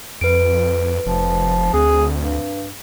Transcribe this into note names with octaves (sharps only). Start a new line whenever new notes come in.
F2 B4 D7
F1 F3
D2 C4 G#4
G2